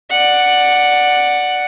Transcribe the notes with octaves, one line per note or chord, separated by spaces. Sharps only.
D5 F#5